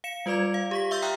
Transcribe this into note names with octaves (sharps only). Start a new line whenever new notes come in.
F5 C#7 E7
G3 F4 B4 D5 D6 G#6
F5
G4 C#6 B6
E5 C6 E6 G6 A6
G5 A#5 D#6 F6 F#6